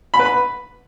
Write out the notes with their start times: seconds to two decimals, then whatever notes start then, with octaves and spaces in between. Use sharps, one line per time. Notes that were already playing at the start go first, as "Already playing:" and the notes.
0.14 B5
0.19 B4
0.25 B5